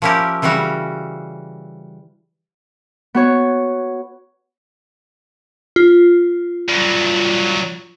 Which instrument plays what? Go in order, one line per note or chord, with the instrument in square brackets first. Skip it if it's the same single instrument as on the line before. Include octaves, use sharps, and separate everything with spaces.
[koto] F3 A#3 C#4 E4 G4 A#4
C#3 E3 G3 C#4 F#4
[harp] B3 F#4 C#5
[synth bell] F4
[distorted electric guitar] G2 F#3